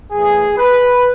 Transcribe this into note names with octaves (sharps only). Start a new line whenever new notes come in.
A2 E3 G#4
B4